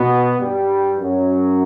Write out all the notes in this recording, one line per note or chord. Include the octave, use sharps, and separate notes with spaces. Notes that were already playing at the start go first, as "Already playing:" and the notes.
Already playing: B2 B3
G2 G3
F#2 F#3